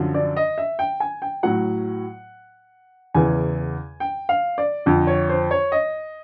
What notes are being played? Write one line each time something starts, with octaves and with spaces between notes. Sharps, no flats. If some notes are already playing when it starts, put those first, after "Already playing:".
Already playing: F#2 D3 F3
D5
D#5
E5
G5
G#5
G5
A2 F#3 F#5
E2 C#3 E3 G#5
G5
F5
D5
F2 D3 F3
C#5
C5
C#5
D#5